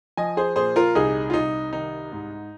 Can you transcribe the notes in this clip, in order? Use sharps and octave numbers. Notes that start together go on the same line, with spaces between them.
F3 D#5 G#5
G#4 C5
A#2 G#4 C5
F4 A#4
C2 D#4 G#4
F4
C2 D#4
D#3 D#4
G#2